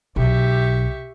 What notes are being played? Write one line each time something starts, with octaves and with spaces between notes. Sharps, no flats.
B1 G4 E5 C#6